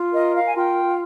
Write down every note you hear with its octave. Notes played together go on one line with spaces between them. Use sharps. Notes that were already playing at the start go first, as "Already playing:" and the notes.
Already playing: F4
A#4 D#5
F5
G#5
F4 G5